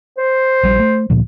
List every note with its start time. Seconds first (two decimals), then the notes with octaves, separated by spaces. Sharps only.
0.17 C5
0.63 A#1 G3
0.80 A3
1.10 D2 A#2 F3